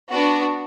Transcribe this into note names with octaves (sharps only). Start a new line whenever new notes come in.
B3 D4 F#4